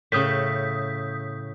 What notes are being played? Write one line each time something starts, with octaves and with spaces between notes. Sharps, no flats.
A2 C#3 D#6 G6 B6